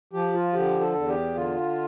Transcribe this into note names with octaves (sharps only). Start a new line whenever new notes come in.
F3 G4
F4
D3 G4
A4
E2
G4
D3 F4